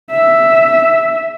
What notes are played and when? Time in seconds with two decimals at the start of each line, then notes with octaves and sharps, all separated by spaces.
0.11 E5